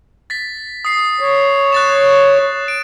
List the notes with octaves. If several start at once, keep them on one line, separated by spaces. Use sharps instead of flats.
A6 B6
D#6 C7
C#5
F#6 A6 E7
D7